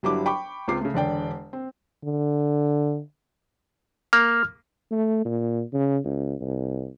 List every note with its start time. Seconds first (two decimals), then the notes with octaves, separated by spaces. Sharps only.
0.03 G1 F#3 G3 D4 E4 D6
0.26 G5 B5 C#6 D6
0.68 C#2 C4 F4 D6 C7
0.81 C#3 A3
0.94 E1 D3 D5 G5
1.53 C4
2.04 D3
4.13 A#3 F6
4.91 A3
5.25 A#2
5.73 C#3
6.04 C#2
6.41 C2